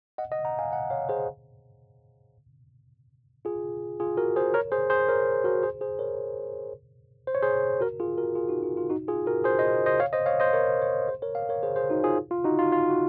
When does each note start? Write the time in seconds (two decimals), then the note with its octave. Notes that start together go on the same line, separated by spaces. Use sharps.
0.18 D#5 F#5
0.32 D#5 F#5
0.45 F#5 A#5
0.59 F5 G#5
0.72 D#5 F#5
0.90 C#5 F5
1.09 G#4 C5
3.45 F4 G#4
4.00 F4 G#4
4.17 F#4 A#4
4.36 G#4 C5
4.54 A#4 C#5
4.72 G#4 C5
4.90 G#4 C5
5.09 A#4 C#5
5.44 F#4 A#4
5.63 G#4 C5
5.81 G#4 C5
5.99 A#4 C#5
7.27 C5
7.35 C#5
7.43 G#4 C5
7.81 F#4 A#4
8.00 F4 G#4
8.17 F#4 A#4
8.35 F4 G#4
8.49 D#4 F#4
8.63 F4
8.77 F4
8.90 D#4 F#4
9.08 F4 G#4
9.26 F#4 A#4
9.44 G#4 C5
9.59 C5 D#5
9.86 C5 D#5
10.00 C#5 F5
10.13 C5 D#5
10.26 C#5 F5
10.40 C5 D#5
10.53 A#4 C#5
10.81 A#4 C#5
11.08 G#4 C5
11.22 A#4 C#5
11.35 C#5 F5
11.49 A#4 C#5
11.63 G#4 C5
11.76 G#4 C5
11.90 D#4 F#4
12.04 F4 G#4
12.31 F4
12.44 D#4 F#4
12.59 F4
12.72 F4
12.90 F#4